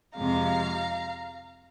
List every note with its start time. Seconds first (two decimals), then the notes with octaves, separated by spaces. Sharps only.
0.16 F2 C3 G#3 F5 A#5